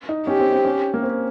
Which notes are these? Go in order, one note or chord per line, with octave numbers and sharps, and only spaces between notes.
D#4
C#4 G4
C4
C4
C#4
A#3
C4